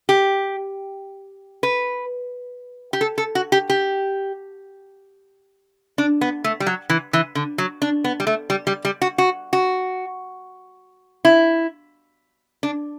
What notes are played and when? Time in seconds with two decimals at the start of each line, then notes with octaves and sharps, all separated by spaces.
0.09 G4
1.63 B4
2.93 G4
3.01 A4
3.18 A4
3.35 F#4
3.52 G4
3.70 G4
5.98 D4
6.21 B3
6.44 A3
6.60 G3
6.66 F#3
6.90 E3
7.13 E3
7.35 D3
7.58 F#3
7.82 D4
8.04 B3
8.20 G3
8.27 A3
8.50 G3
8.67 G3
8.85 G3
9.02 F#4
9.18 F#4
9.53 F#4
11.25 E4
12.63 D4